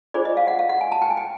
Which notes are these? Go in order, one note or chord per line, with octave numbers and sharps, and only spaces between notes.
D4 F4 G#4 C5 D5
D#5
F5
F#5
F5
F#5
G#5
A5
G5
G#5
G5